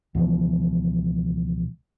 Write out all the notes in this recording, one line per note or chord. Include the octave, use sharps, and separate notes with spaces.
C#2 B2 E3 F3